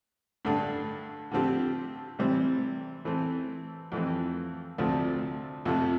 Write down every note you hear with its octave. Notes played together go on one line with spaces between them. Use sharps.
G2 D3 A3 D4
D3 F3 A3 C4 G4
C3 E3 G3 C4
E3 A3 C4
F2 E3 A3 C4
D2 C3 F3 A3
F2 C3 F3 A3